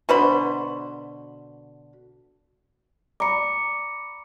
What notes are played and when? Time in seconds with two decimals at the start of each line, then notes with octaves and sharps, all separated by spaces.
0.09 B2 D3 C5 B5
3.20 D5 A#5 B5 D6 C#7